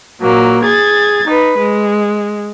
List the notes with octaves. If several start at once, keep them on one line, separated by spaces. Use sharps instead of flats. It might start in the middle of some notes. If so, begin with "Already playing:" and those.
A#2 F#3 A#3
G#4 G#6 A6
D#4 B4
G#3